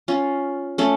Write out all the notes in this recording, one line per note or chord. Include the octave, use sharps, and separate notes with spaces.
C#4 F4
A3 C#4